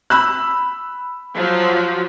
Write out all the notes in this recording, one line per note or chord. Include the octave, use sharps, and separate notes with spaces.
B5 E6 F#6
F3 F#3